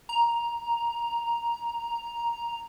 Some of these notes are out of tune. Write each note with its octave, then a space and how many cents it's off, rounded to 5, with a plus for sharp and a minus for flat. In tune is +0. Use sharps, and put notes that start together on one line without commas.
A#5 +5